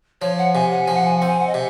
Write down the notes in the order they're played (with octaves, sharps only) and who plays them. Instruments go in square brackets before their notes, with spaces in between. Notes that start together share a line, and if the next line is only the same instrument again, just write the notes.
[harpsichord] F3 [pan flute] C#5
[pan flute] F#5
[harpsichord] C3 [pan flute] G#5
[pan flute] F#5
[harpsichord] F3 [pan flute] G#5
[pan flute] F#5
G#5
F#5
[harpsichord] C4
[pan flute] G#5
F#5
D#5
[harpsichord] C3